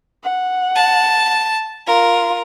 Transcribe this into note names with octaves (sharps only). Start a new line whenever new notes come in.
F#5
A5
F4 A#4